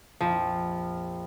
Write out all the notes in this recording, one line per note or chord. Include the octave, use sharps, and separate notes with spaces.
A#1 F2 F3